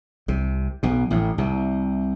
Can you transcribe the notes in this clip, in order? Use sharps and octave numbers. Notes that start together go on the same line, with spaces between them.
C2 C3
B1 B2
A1 A2
C2 C3